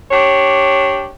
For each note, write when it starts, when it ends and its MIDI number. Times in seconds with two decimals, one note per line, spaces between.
0.11 1.09 62
0.11 1.09 67
0.11 1.09 73